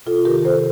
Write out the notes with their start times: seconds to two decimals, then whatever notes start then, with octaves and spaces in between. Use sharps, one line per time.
0.06 C3 F4 A4
0.25 D#3 G4 A#4
0.45 C3 A4 C5